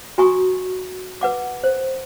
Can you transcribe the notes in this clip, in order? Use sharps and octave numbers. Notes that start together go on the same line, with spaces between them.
F#4 G#5 A#5 C#6 D#6
B4 F#5 D6
C5